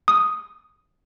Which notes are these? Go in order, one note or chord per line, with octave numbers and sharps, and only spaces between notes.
D#6